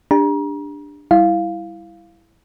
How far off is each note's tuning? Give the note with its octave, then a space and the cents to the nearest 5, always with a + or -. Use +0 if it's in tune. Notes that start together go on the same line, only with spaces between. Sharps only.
D4 +0 G4 +35 A#5 +35
G3 +0 E4 +0 F5 +0